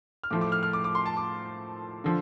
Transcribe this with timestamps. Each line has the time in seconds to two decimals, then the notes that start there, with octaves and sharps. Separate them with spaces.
0.23 F6
0.31 A2 F3 A3 D6
0.41 D6
0.52 F6
0.63 F6
0.73 D6
0.84 D6
0.95 C6
1.06 A5
1.17 D6
2.04 D3 F3